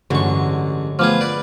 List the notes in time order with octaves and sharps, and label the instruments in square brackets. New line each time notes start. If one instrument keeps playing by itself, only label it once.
[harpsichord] A1 C#6 [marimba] G2 [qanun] D3 F#3 G#3
[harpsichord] F3 B3 G#4 [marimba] A3 D6 F6
[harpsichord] B4 D5